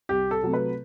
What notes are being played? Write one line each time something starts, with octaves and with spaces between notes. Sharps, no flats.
C2 G4
A4
C3 F#3 A3
B4